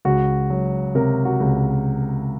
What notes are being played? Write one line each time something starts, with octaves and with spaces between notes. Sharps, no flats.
C#2 F#4
F#3
C3 A#4
F#4
C#2